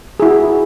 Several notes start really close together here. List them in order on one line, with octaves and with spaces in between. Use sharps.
G#4 E4 F#4